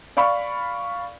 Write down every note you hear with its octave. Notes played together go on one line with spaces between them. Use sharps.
D5 F5 B5 C#6